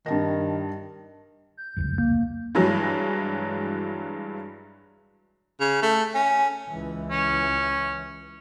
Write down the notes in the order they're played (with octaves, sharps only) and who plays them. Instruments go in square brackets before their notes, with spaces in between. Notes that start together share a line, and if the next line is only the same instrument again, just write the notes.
[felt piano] G2 A5 A#6 [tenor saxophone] D#3
[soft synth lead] G6
[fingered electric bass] F1 C#2 F#2
[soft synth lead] A#3
[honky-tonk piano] G2 E3 F#3 G#3
[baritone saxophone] C#3
A3
C#4
[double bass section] C#2 E3
[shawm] C#4